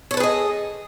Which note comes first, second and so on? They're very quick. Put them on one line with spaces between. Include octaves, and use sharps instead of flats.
C#5 A4 B4 G#4 D#5